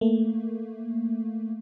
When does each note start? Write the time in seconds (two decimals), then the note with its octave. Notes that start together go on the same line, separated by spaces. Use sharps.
0.01 A3 A#3